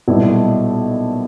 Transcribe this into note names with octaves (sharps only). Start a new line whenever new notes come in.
B1 A#2 G3 B3 E4